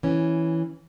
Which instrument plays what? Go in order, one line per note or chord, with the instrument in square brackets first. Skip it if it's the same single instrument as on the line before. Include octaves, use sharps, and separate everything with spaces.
[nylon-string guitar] E3 C#4